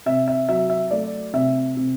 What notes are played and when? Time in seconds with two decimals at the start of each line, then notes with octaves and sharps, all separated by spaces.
0.06 C3 E5
0.28 E5
0.49 F#3 E5
0.70 E5
0.91 A3 D5
1.33 C3 E5
1.77 C3